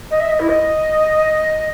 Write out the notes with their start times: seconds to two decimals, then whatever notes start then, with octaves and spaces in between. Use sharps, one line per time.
0.11 D#5
0.20 E5
0.30 D#5
0.40 E4
0.49 D#5